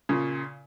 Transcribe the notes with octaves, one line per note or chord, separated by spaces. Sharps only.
A#2 C#3